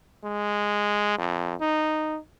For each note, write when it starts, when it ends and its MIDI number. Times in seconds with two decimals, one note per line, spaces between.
0.23 1.15 56
1.18 1.55 41
1.60 2.18 63